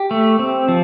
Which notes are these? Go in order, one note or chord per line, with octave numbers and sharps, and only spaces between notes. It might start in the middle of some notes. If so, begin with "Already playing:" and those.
Already playing: G4
A3
C4
F3